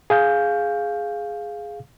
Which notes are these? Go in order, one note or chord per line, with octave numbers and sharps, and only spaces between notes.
G#4 F5 G6